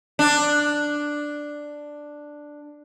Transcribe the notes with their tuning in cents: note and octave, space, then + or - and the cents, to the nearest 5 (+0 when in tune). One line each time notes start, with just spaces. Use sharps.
D4 +5